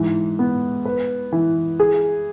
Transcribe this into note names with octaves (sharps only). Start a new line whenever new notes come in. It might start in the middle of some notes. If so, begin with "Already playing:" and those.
Already playing: G#2 E3
B3
B4
E3
G#4